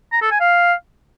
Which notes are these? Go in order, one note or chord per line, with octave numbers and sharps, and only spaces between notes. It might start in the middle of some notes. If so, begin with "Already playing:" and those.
A#5
A4
G#5
F5